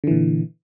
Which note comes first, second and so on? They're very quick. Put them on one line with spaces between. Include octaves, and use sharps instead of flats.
D3 E3 A#2